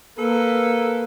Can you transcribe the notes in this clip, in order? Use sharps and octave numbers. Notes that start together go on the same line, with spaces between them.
A#3 A4 B4